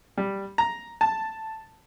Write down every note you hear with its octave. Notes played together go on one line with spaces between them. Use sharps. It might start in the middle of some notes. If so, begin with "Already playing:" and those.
G3
A#5
A5